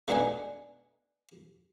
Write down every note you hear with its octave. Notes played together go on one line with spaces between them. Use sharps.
A3 B3 D4 D#4 F#5 G#5